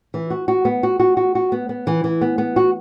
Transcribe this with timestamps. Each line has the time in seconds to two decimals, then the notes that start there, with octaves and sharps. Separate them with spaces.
0.14 E3
0.30 F#4
0.48 F#4
0.65 B3
0.83 F#4
1.00 F#4
1.17 F#4
1.35 F#4
1.52 B3
1.69 B3
1.87 E3
2.04 E3
2.21 B3
2.38 B3
2.56 F#4